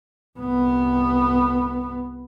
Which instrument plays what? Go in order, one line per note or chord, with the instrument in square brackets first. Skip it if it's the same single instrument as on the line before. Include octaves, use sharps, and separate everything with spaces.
[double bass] C2 B3